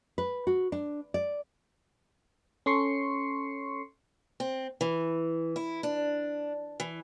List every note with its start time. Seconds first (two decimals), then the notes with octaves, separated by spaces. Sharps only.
0.18 B4
0.47 F#4
0.72 D4
1.14 D5
2.66 C#4 A4 C6 C#6 C7 C#7
4.40 C4
4.81 E3
5.56 E4
5.83 D4
6.80 E3